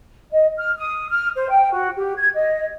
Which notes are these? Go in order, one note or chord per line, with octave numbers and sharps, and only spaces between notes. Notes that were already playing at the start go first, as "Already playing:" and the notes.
D#5
F6
D#6
F6
C5
G5
F#4
G4
G#6
D#5